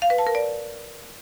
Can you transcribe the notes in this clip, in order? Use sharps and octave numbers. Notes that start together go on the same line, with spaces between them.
F5
B4
A5
A#4
D5